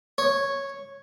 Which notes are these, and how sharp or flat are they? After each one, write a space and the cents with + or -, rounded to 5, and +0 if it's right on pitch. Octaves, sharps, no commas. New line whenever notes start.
C#5 -5